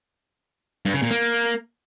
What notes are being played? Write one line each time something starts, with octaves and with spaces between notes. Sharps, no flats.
G2
C#3
A#2
A#3